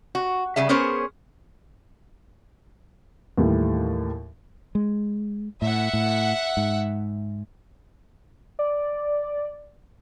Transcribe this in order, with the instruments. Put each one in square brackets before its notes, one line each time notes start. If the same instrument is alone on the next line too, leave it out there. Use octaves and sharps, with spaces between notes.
[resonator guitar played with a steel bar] F#4
C#3 G3 G#4 E5
B3 C#4 G#4 A#4 C5 C#5
[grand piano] D#2 A2 E3 G3 A3
[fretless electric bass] G#3
[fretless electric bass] A2 [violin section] E5 F#5
[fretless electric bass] A2
G#2
[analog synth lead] D5